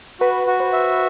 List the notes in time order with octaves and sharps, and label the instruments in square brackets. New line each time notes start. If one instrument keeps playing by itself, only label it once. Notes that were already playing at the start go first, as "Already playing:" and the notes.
[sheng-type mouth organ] F#4 [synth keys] B4
[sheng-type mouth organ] F#4
[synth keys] C5
[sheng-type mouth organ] E5